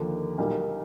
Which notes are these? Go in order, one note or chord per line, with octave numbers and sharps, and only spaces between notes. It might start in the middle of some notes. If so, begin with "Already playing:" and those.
Already playing: D#2 D3 F3 A#3
B1 A#2 G3 A#3